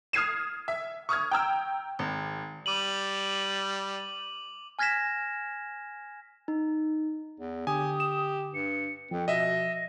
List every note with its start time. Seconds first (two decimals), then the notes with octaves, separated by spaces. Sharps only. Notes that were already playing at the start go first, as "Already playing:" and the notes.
0.13 D#6 F6 G#6 C7 D#7 E7
0.68 E5
1.09 C#6 D#6 F6 G#6
1.31 G5 A#5 E6
1.99 G#1
2.66 G3 D6 D#7 F#7
4.79 G#5 F6 G#6 A#6 B6 E7
6.48 D#4
7.40 E2
7.67 D3 G4 G#5 D#6
8.00 E7
8.54 G2 C#7
9.11 F2 F3 G5
9.28 B2 D#5 E5 A#6